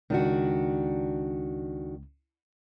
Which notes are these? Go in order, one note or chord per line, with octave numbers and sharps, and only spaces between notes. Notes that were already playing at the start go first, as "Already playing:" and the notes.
C#2 D#3 D4 F#4